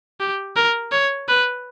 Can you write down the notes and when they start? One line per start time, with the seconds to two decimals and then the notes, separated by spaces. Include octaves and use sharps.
0.20 G4
0.56 A#4
0.92 C#5
1.28 B4